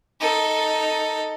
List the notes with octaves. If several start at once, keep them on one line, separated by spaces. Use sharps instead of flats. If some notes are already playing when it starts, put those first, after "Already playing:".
D#4 A4